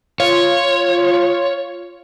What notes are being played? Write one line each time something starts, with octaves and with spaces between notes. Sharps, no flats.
F4 C#5